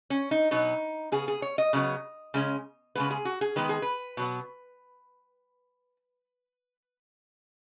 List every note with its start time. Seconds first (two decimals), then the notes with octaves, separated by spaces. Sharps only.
0.10 C#4
0.31 D#4
0.51 B2 F#3 B3 D#4
1.12 C#3 B3 G#4
1.28 G#4
1.42 C#5
1.58 D#5
1.73 C#3 F#3 B3
2.34 C#3 G#3 C#4
2.95 C#3 G#3 B3 B4
3.11 G#4
3.25 F#4
3.41 G#4
3.56 D#3 G#3 B3 B4
3.69 G#4
3.82 B4
4.17 B2 F#3 B3